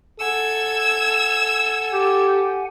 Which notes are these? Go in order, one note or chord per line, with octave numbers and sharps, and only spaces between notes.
A4 F#5 G#5 E6 G#6
G4